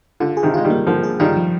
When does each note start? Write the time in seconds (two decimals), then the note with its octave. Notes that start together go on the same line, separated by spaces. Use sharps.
0.20 D3 F4
0.37 G#4
0.43 C3 D#3
0.54 G#3 F4
0.64 D#3 G3
0.70 A#3
0.87 D3 F3 A#3
1.03 G#4
1.20 D#3 G3 F4
1.36 F3